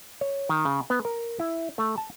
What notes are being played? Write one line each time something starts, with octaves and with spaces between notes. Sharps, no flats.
C#5
D#3
C#3
B3
A#4
E4
A3
A5